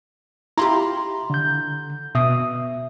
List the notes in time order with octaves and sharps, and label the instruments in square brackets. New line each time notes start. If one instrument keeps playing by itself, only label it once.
[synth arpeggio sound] E4 F4 G4 [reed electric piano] A#5 C6
[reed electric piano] D3 G6
[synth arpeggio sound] B2 [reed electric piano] E5 D#6